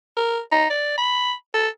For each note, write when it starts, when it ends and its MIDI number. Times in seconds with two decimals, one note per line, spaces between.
0.17 0.39 70
0.52 0.67 63
0.70 0.95 74
0.98 1.32 83
1.54 1.68 69